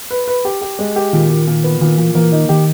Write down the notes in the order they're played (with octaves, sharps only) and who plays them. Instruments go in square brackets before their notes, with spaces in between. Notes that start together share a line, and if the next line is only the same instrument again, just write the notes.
[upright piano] B4
B4
G4
G4
G#3
G4
[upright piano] A#2 [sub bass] D#3
[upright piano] A#2
A#2
B3
[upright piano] A#2 [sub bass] D#3
[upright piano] A#2 [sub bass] E3
[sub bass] E3 [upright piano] A#3
[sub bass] D#3 [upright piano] D#4
[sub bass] D#3 [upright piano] G4